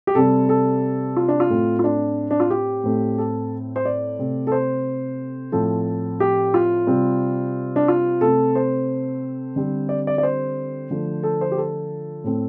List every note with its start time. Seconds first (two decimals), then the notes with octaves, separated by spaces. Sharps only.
0.07 G4
0.15 C3 G3 C4 A4
0.49 A4
1.17 F4
1.28 D4
1.40 F4
1.50 A2 A3 C4
1.79 F4
1.84 D4
2.31 D4
2.40 F4
2.50 G4
2.84 A2 A3 C4
3.18 A4
3.76 C5
3.85 D5
4.19 C3 A3 C4
4.47 A4
4.52 C5
5.52 A2 F3 A3 C4 A4
6.20 G4
6.54 F4
6.87 C3 G3 C4
7.76 D4
7.88 F4
8.21 C3 A3 C4 A4
8.55 C5
9.56 D3 G3 C4
9.89 D5
10.07 D5
10.18 D5
10.23 C5
10.90 D3 F3 A3
11.23 A4
11.41 C5
11.52 G4
11.57 A4
12.24 A2 A3 C4